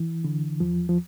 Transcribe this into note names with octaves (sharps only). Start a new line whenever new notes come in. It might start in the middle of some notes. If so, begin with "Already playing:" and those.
Already playing: E3
D3
E2 F3
F3